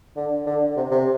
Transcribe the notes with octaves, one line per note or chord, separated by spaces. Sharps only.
D3
D3
C3
C3